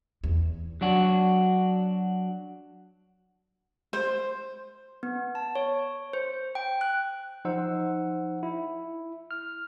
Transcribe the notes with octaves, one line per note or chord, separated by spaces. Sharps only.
E2
F#3 D4 F#4
C5
B3
A5
C#5
C5
G5
F#6
F3 D#4 C5 F#5 E6
E4
F6